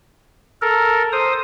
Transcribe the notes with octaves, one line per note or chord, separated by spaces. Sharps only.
A4 A#4
C5 D#6